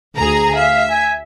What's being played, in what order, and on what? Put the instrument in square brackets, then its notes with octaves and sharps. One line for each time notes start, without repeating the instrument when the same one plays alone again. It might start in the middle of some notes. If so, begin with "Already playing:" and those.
[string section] D2 G#4 A#5
[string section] E5 [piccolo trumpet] F5
[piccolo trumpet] G#5